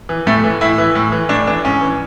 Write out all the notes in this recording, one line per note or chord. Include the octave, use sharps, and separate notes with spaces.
E3
A2 A3
E3
A2 E4
E3
A2
E3
A2 D4
E3 D4
G#2 C#4
E3